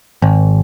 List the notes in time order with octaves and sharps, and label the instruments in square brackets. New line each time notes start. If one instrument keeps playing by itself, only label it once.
[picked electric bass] G#1